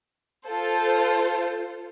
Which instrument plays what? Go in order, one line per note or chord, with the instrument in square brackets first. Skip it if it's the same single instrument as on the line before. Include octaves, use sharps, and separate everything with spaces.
[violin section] F4 A4 C5